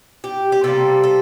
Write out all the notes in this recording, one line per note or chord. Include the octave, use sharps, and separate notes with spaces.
G4
G4
C3 G3 A#3 A4
A4